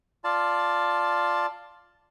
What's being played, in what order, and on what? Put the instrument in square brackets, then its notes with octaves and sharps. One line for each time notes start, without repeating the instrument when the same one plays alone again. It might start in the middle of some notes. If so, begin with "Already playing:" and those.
[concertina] F4 D5 A5